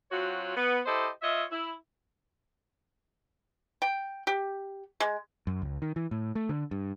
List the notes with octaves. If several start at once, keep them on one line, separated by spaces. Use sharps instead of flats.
F#3 C4 F4 F#4 C#5
B3
E4 G4 A4 C5 D#5
F4 C#5 D#5 E5
E4
G5
G4
G#3
F#2
C#2
D#3
E3
A2
A3
D3
G2